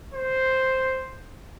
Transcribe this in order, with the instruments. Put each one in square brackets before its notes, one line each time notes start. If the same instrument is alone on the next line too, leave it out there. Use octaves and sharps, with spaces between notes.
[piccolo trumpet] C5